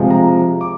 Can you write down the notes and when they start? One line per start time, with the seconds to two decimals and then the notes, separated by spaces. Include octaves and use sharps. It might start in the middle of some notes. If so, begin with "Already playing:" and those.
Already playing: C3 F3 G#3
0.10 A#5
0.61 D6